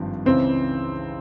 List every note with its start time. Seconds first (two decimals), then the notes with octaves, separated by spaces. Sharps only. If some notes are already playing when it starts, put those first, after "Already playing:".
Already playing: G#1 G2 F3 C4
0.25 C#2 C#3 E3 C4